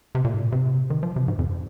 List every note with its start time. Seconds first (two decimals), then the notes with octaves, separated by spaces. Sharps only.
0.15 C3
0.24 A#2
0.34 G#2
0.42 A#2
0.52 C3
0.90 D#3
1.03 F3
1.16 C3
1.28 G#2
1.39 F2